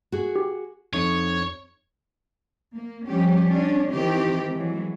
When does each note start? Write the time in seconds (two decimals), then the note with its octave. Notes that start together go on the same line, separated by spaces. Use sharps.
0.12 F#4 G#4
0.36 G4
0.94 F2 D#4 C#5
2.75 A#3
3.07 F3 G3 C#4 G4
3.50 C#4 D4
3.93 D#3 E3 C4 G4
4.53 E3 F#3 G#3